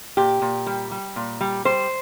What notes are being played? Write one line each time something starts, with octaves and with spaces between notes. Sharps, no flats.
A#2 G4
A#2
G3
G3
A#2
G3
G3 C5